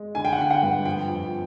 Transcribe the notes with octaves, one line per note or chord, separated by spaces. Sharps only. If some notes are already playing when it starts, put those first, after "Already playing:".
Already playing: G#3
D3 G#5
G5
F#5
D3 G5
F#5
G2
F3 G5
F2